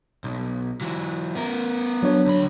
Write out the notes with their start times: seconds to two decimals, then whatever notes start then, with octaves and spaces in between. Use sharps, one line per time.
0.24 B1
0.81 E3 F#3
1.35 B3 A#4
2.03 F#3 D4 C#5
2.26 D2 B5